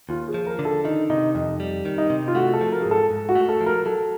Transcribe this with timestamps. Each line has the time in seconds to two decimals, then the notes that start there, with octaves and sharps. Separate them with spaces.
0.09 D#2 F4
0.28 G#4
0.34 F3
0.47 A#4
0.59 D3
0.65 A4
0.85 D#3 D#4
1.10 C3 D#4
1.34 F2 D#4
1.60 G3
1.85 D#3
1.98 D#4
2.10 C3
2.28 F4
2.35 A3 F#4
2.54 A4
2.61 F3
2.72 A#4
2.82 G#2 G#4
2.91 A4
3.11 G#2
3.29 F#4
3.35 A3
3.49 A4
3.61 F3
3.66 A#4
3.86 F#3 A4